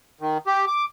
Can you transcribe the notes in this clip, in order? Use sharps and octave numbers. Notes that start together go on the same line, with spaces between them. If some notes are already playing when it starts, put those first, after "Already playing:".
D#3
G4
D6